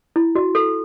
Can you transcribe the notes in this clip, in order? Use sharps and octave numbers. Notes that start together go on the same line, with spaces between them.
E4
F#4
A4